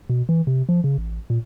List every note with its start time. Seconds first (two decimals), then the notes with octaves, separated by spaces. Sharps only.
0.10 B2
0.29 E3
0.47 C3
0.69 F3
0.84 C#3
0.98 A1
1.30 A#2